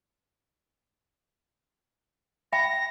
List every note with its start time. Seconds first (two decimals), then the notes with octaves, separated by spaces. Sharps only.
2.53 E5 G5 B5 A#6